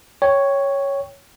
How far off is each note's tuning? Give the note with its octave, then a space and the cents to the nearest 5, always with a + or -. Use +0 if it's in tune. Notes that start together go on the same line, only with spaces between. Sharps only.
C#5 +0 G5 +0